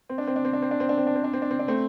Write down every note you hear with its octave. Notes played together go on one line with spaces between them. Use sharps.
C4
D4
C4
D4
C4
D4
C4
D4
C4
D4
C4
D4
C4
D4
C4
D4
C4
D4
A3 C4